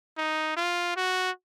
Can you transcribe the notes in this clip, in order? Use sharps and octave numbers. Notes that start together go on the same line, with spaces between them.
D#4
F4
F#4